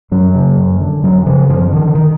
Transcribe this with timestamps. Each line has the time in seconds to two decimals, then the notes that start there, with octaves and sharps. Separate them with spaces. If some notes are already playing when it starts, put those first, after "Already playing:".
0.11 F#2 F#3
0.35 C#3
0.57 F#2
0.81 D3
1.03 F2 F#3
1.26 C#3 F3
1.49 F#2 F3
1.72 D3 D#3
1.95 D#3